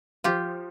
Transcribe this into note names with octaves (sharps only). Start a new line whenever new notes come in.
F3 F4 G4